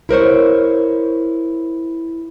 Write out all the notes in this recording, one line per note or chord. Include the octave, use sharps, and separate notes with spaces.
E4 A#4 C5 C#5